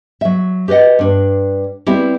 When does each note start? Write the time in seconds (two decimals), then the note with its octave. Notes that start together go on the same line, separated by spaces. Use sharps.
0.21 F#3 E5
0.68 G4 B4 D5 D#5 F#5
0.99 G2 D4
1.86 G3 B3 C4 E4 G4